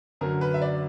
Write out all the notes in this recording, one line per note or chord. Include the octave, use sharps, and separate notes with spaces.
F#2 D3 F#3 A#4
B4
E5
D5